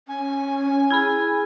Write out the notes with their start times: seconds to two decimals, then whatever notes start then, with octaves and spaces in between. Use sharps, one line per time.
0.08 C#4 G#5
0.90 E4 G#4 B5 F6 G#6